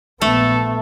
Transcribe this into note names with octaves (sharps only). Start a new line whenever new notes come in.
A#1 A3 B3 A4